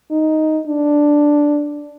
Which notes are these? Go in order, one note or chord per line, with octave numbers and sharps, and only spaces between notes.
D#4
D4